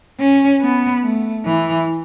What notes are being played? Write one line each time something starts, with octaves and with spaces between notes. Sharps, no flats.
C#4
B3
A3
E3